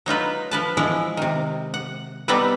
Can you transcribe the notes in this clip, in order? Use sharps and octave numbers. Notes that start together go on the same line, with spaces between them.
F#3 D#4 F4 B4
F3 B4 A5
E3 F3 G#3 E4
C3 D#3
F#5
G3 B3 C4 D#4 A4 B4